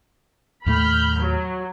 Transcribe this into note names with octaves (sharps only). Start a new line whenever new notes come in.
D#2 A2 A3 B5 F6 G6
F#3